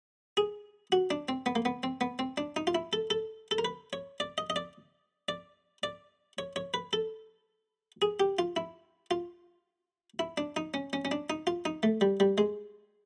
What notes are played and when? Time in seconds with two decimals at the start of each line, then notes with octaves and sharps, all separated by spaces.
0.37 G#4
0.92 F#4
1.11 D4
1.29 C4
1.46 B3
1.55 A#3
1.65 B3
1.83 C4
2.01 B3
2.19 C4
2.38 D4
2.56 D#4
2.67 F4
2.75 E4
2.93 A4
3.10 A4
3.51 A4
3.58 A#4
3.65 B4
3.93 C#5
4.20 D5
4.38 D#5
4.50 D#5
4.56 D5
5.29 D5
5.83 D5
6.38 C#5
6.56 C#5
6.74 B4
6.93 A4
8.02 G#4
8.20 G4
8.39 F4
8.56 E4
9.11 F4
10.19 E4
10.38 D4
10.56 D#4
10.74 C#4
10.93 C#4
11.05 C#4
11.11 D4
11.30 D#4
11.47 F4
11.65 D#4
11.83 A3
12.01 G3
12.20 G3
12.38 G#3